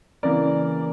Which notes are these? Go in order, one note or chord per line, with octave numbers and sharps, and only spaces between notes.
C#3 E3 A#3 A#4 D5